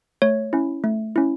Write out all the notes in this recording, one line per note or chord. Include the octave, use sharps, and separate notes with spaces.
A3 C#5
C#4 E4
A3
C#4 E4